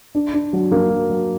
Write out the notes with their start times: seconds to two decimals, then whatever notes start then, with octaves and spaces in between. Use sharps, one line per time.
0.15 D4
0.34 D4
0.53 F#3
0.71 A#3
0.91 F#3
1.10 F#3